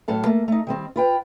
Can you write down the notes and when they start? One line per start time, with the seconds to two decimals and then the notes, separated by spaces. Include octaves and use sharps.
0.08 A2 F#3 A4 F5
0.26 A3 A#3
0.48 A3 D#4
0.67 D#3 G3 C4
0.96 F4 B4 G5